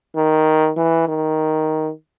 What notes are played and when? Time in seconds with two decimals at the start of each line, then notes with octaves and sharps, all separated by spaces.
0.15 D#3
0.77 E3
1.08 D#3